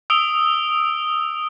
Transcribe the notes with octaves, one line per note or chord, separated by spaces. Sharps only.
D#6 E6 D7 F7 G7